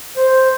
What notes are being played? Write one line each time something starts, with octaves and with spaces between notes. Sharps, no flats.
C5